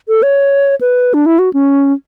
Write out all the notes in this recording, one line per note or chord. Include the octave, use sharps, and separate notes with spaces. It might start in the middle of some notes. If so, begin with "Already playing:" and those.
A4
C#5
B4
D4
E4
F#4
C#4